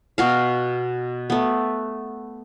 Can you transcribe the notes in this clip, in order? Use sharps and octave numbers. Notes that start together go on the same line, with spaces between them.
B2 F#4 F5
A3 B3